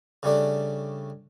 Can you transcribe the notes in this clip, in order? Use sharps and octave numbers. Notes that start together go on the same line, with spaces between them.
C#3 G3 A3 D4